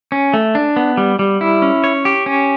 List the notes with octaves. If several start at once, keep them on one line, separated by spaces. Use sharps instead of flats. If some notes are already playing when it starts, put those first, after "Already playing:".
C#4
A3
D4
B3
G3
G3
E4
C#4
C#5
G4
C#4